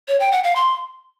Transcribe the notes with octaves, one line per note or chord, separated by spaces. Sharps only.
C#5
G5
F#5
F5
C6